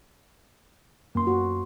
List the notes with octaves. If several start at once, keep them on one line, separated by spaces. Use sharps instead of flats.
F#2 A#3 C6
F#4